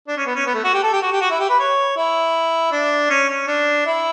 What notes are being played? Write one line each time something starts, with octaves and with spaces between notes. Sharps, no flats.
D4
C#4
B3
C#4
B3
A3
F#4
G4
A4
G4
F#4
G4
F#4
E4
G4
B4
C#5
E4
D4
C#4
C#4
D4
E4